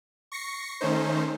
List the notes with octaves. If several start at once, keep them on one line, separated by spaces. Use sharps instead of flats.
C#6 A#6 C7 C#7
D#3 A3 C#4 D#4 C5